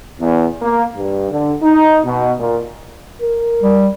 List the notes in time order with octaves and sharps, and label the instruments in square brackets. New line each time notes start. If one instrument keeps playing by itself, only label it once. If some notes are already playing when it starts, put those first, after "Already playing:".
[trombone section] E2
A#3
G2
D3
D#4
B2
A#2
[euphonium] A#4
[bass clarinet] G3